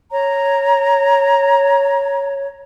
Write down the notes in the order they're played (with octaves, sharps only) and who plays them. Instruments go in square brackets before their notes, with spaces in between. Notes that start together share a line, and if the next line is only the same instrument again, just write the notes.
[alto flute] C#5 [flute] A#5